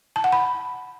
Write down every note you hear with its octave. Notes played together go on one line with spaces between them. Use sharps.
A5
F#5
B5